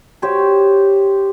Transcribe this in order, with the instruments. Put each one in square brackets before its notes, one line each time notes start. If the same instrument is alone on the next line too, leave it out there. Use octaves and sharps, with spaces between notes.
[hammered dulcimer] G4 C5 C#5 G5